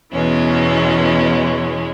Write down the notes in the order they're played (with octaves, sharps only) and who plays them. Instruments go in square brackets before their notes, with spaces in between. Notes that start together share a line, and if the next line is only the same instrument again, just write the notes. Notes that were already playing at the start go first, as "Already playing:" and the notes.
[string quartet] E2 B2 E3 G#3 C#4